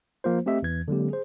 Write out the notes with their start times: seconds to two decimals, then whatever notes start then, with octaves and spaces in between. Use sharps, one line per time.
0.24 F3 A#3 F4 C5
0.46 A3 C4 G4 D#5 E5
0.62 E2 E3 G#6
0.88 D3 F#3 G#3 A#3 C4 G4
1.10 G#4 C5